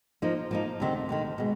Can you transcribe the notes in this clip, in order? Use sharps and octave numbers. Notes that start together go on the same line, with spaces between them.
F3 A#3 D#4
F3 A#3 D#4
D2 C3 D#3
D2 C3 D#3
B2 G#3